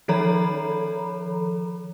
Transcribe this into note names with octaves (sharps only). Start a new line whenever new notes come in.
D#3 F3 A4 C#5 A#5 B5